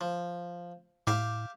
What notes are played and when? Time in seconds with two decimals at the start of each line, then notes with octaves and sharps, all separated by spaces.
0.01 F3
1.07 A2 G4 E5 F5